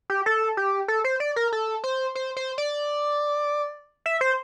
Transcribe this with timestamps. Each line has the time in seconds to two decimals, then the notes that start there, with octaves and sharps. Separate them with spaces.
0.10 G4
0.26 A4
0.57 G4
0.88 A4
1.04 C5
1.20 D5
1.36 A#4
1.53 A4
1.84 C5
2.15 C5
2.37 C5
2.58 D5
4.06 E5
4.21 C5